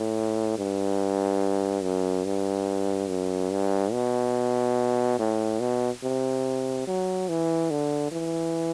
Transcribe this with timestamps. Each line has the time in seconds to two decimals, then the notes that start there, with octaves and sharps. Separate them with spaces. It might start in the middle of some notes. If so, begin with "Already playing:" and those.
Already playing: A2
0.58 G2
1.83 F#2
2.25 G2
3.09 F#2
3.52 G2
3.92 B2
5.19 A2
5.60 B2
6.03 C3
6.87 F#3
7.29 E3
7.71 D3
8.12 E3